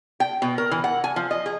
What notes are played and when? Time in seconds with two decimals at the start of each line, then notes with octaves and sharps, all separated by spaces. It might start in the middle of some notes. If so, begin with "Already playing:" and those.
0.20 G5
0.42 B2
0.58 A#4
0.71 E3
0.84 F#5
1.04 G#5
1.16 F3
1.31 D#5
1.46 G#4